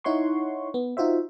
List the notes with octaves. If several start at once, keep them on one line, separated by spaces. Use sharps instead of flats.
D#4 E4 C#5 F#5 C6 C#6
B3
D#4 F4 F#4 C5 E5